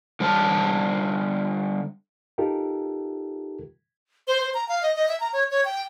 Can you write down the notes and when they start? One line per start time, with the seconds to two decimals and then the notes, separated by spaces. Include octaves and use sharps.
0.20 D3 G3 C5 G#5 A5
2.38 D#4 F4 G4 A4 A#4
4.27 C5
4.41 C5
4.54 A#5
4.69 F5
4.83 D#5
4.96 D#5
5.08 E5
5.20 A#5
5.33 C#5
5.51 C#5
5.65 G5